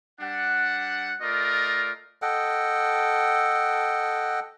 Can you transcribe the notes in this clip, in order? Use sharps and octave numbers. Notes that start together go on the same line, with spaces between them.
G3 D4 F#5
A3 F4 A#4 D5 D#5
A4 D#5 F#5 G5